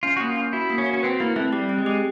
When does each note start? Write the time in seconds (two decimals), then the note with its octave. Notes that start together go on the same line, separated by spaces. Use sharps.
0.03 C#4 F4
0.16 A#3 F#4
0.29 F4
0.36 C#4
0.53 E4 F#4
0.70 A#3
0.78 C#4
0.86 F#4
0.93 C#4
1.03 C4 B4
1.20 A#3 E4
1.36 A3 C4
1.53 G3 G4
1.69 C4
1.78 G#3
1.86 G4